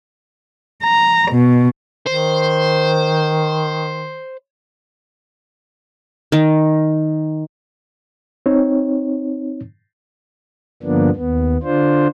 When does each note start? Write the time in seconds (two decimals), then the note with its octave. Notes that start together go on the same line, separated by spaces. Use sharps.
0.84 A#5
1.31 B2
2.07 D#3 C5
6.32 D#3
8.46 C4 D#4 C#5
10.83 G2 D3 F3 A#3 B3 D4
11.15 D#2 B3
11.63 D3 D4 F4 C5